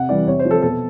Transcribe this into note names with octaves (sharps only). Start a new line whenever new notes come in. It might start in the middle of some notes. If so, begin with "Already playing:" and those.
Already playing: C3 F#5
E3 G3 D5
C3 C#5
C5
F3
A4
B2 A4